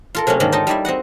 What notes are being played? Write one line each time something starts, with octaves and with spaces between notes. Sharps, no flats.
F4 A4 A#4
C3 F#3 A3 A#3 C#4
G#2 D3 D#3 A#3
D#4 F4 A4 D#5 G5 A5
G3 D#4 E4 D5 E5
C4 F#4 D#5 F#5